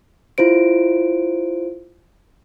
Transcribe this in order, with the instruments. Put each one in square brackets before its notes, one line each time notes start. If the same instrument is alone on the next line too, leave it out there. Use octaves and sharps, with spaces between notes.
[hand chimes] E4 F4 C5 D7